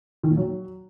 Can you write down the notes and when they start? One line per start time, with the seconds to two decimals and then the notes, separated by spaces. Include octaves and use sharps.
0.23 D#3
0.30 A#2
0.37 F#3